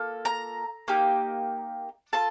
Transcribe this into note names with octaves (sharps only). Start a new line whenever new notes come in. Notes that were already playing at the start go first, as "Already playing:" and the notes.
Already playing: A#3 F4 A4
A#5
A#3 D#4 G4
F4 A4 A5